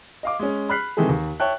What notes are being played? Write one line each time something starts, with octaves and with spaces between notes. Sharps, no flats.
D#5 F5 D6
G#3 C#4
B5 F6 F#6 B6 C7
C3 D#3 E3 G#3 G#4 A4
D#2
C#5 E5 G5 A5 F#6